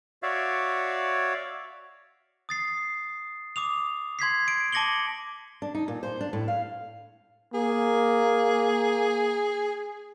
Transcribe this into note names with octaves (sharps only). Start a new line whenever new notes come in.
F#4 C#5 D5 E5 F5
D#6 A6 C7
D6 D#6 F7
C6 G#6 B6 C7
D7
A5 D6 A#6 C#7 F#7 G7
D4
D#4
A#2
C5
D4
A2
F5
A#3 G#4